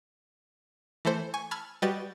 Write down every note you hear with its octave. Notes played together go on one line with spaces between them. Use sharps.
E3 A3 A4 C5
G#5 C#6
A5 B5 E6 F6 G#6
G3 F#4 B4 D#5 G5 A6